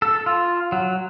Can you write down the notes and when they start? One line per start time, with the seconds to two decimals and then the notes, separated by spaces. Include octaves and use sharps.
0.02 A4
0.26 F4
0.72 F#3